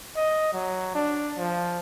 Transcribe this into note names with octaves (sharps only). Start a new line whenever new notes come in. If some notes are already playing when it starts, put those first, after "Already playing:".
D#5
F#3
D4
F3